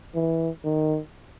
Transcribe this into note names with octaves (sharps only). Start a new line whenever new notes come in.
E3
D#3